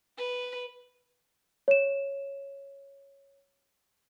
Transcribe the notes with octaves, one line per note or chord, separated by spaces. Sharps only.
B4
C#5 E7